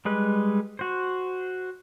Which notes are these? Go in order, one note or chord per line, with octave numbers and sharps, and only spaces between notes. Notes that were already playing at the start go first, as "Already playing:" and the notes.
G3 G#3 B4
F#4 C5